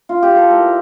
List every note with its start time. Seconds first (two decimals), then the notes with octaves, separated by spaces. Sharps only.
0.09 F4
0.22 G4
0.36 A4
0.50 A2 A#4